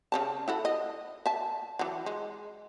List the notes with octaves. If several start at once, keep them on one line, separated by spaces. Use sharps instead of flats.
C#3 C#4 A5
E4 F#4 A4
D#5
E5 A5
E3 F#3
G#3